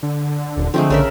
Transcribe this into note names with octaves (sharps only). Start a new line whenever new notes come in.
D3
D#1
D3 F3 G#3 A3 C4
A#1 C#3 A#4 E5